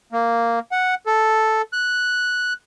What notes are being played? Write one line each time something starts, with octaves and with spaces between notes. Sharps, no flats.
A#3
F#5
A4
F#6